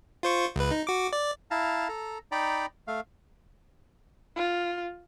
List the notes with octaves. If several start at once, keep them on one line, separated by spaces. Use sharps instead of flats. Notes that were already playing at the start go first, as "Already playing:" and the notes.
F4 C5 C#6
C#2 B4
D#4
F#4 D6
D5
E4 F5 A5 A#5
A4 A#5
D#4 D5 G5 A#5 B5
A3 F5
F4